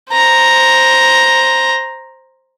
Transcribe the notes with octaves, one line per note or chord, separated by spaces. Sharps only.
C5 A#5